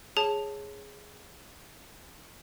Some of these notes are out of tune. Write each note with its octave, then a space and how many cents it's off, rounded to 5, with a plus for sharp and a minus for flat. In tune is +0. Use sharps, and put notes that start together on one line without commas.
G#4 +0 C#5 -10 A5 +0